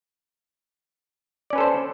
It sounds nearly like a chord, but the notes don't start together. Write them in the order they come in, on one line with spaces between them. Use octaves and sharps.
D5 C#4 B4 A4 C5